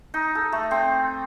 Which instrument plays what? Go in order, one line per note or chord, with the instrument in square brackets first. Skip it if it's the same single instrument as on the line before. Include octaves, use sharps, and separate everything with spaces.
[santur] D#4
A4
A3
C4